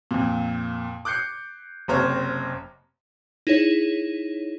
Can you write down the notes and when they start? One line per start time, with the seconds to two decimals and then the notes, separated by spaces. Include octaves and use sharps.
0.11 F2 A#2
1.05 D6 F#6 G6 C7 C#7
1.88 F#1 C3 C5 C#5 F6
3.47 D#4 E4 G#4 C#5